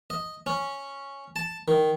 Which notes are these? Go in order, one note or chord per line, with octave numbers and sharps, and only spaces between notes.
D#5
C#4
A5
D#3